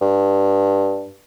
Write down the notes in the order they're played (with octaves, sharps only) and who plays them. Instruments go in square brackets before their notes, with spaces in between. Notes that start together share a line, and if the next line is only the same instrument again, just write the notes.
[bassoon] G2